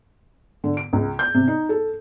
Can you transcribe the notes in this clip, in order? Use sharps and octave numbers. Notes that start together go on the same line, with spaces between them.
D3
D7
C#2
G6
C3
D#4
A4